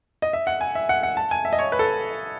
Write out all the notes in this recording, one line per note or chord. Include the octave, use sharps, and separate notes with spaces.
D#5
E5
F#5
G#5
E5
F#5
F#5
A5
G#5
E5
D#5
C#5
B4
A4